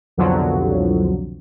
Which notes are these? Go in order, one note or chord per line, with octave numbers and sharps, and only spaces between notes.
C2 F2 B2 D3 F3 F#3